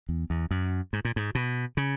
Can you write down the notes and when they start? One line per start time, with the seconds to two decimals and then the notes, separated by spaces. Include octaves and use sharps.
0.09 E2
0.30 E2
0.51 F#2
0.93 G#2
1.05 A#2
1.16 G#2
1.35 B2
1.77 C#3